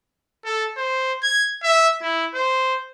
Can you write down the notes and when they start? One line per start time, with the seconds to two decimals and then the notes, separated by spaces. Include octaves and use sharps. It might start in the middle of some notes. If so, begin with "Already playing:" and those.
0.45 A4
0.77 C5
1.23 G#6
1.63 E5
2.02 E4
2.34 C5